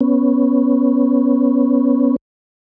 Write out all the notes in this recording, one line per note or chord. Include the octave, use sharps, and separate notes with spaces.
B3 C#4